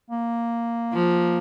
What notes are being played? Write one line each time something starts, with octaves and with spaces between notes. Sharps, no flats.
A#3
F3